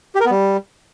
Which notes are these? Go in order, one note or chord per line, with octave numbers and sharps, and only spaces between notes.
G4
A#4
B3
G3